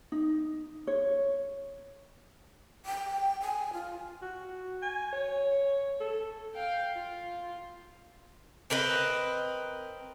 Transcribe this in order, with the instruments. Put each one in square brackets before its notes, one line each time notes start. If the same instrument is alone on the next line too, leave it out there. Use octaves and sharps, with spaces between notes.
[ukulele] D#4
C#5
[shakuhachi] G5
G#5
F4
[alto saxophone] F#4
G#5
C#5
A4
[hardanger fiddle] F5 G5
F4
[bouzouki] C4 A#4 B4 D#5